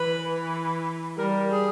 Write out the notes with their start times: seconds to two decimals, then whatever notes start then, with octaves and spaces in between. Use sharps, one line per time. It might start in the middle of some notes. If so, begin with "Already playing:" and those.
Already playing: E3 B4
1.18 G3 A#4
1.50 G#4